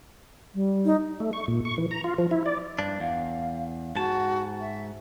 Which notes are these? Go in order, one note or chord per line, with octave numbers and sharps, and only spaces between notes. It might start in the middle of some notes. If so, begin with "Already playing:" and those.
G3
D#4
A3
C#6
A#2
C#6
E3
A#5
F4
F3
E4
D5
G2 D4
E2 F5
G#2 F#4 A5
E5